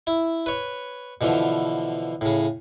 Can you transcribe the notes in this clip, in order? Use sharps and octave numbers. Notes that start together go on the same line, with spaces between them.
E4
B4 C#5
B2 D3 E3 F3
A2 C#3